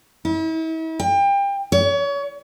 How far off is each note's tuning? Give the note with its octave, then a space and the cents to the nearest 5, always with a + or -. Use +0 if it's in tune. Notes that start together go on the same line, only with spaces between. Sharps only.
E4 -40
G5 +30
C#5 +30